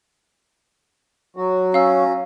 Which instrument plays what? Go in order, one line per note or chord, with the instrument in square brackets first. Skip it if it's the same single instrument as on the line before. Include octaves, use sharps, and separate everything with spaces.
[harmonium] F#3 F#4
[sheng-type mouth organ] C#4 [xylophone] F5 E6